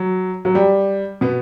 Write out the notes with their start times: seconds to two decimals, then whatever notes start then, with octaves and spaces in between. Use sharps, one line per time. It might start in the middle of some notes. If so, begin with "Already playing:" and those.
Already playing: F#3
0.45 F#3
0.55 G3
1.21 B2 B3